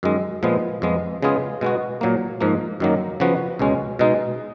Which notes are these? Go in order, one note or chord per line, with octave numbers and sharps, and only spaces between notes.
F#2 D#3 G#3
A#2 F3 G#3 B3
F2 F3 G#3 B3
C#3 G#3 B3 F4 G#4
B2 G#3 B3 F#4
A#2 F#3 A#3
G#2 F3 A#3
F#2 D#3 F#3 A#3
C#3 F3 B3 F#4
C#2 B2 G#3 C#4
B2 G#3 D#4